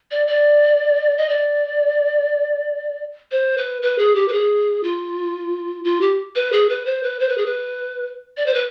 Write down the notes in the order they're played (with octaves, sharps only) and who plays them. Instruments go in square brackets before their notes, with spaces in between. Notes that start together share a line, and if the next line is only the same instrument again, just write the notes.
[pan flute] D5
D5
D#5
D5
C5
B4
B4
G#4
G4
B4
G#4
F4
F4
G4
B4
G#4
B4
C5
B4
C5
B4
G#4
B4
D5
C5
B4